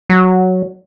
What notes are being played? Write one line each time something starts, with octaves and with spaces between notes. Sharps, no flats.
F#3